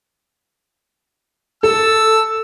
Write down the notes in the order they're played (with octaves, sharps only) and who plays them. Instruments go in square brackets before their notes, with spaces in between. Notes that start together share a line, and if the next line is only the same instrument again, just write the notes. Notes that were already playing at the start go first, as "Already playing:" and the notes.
[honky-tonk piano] A4 [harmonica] A5 E6